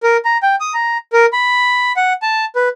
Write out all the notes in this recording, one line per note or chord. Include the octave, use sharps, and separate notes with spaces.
A#4
A#5
G5
D#6
A#5
A#4
B5
F#5
A5
B4